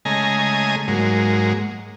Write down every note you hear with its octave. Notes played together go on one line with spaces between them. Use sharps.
C#3 G#3 A3 D#5 G#5 A#5
G#2 F#3 G#3 A#3